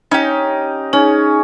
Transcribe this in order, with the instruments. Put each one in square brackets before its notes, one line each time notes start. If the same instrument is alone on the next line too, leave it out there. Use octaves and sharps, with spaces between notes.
[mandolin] C#4 G4 [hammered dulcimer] D#4
[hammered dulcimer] C#4 [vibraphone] D#4 G#4